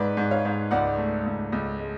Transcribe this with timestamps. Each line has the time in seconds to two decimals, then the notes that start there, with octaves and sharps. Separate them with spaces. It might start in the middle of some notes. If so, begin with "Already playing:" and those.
Already playing: G#2 B4 D5
0.17 G#2
0.31 C#5 F5
0.45 G#2
0.71 C#2 D5 F#5
0.98 A3
1.26 C#2
1.52 C#2
1.80 G#3